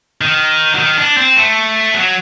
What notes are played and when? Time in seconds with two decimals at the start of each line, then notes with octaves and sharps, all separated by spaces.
0.21 D#3
0.75 F#3
0.79 D#3
0.98 D4
1.17 C4
1.37 A3
1.94 F#3